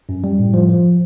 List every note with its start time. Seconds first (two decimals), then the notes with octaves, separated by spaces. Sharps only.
0.09 F#2
0.24 G3
0.39 A2
0.54 F3
0.69 F3